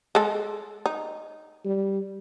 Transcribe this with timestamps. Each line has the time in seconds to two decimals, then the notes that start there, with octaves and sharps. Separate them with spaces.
0.15 G#3 A4
0.86 D#4
1.65 G3